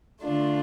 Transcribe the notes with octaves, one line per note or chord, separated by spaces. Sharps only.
D3 A3 D4 F4